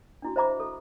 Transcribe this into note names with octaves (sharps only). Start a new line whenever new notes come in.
D4 E4 F#4
C5 D#5 E5 A#5 B5 D6
A4